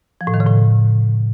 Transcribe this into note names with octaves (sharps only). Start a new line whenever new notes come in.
F3
A2
D#3
C#3
A2